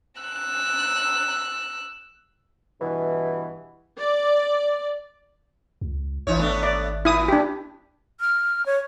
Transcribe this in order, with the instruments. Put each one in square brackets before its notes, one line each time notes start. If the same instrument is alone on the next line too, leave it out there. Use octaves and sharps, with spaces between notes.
[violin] E6 F#6
[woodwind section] G2 B2 E3
[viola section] D5
[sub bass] C#2
[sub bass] G#1 [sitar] E3 D#4 C#5
[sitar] A3 B3 D4
[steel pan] D5
[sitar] A#2 [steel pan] E4 D#6
[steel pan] D4 G4
[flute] F6
C#5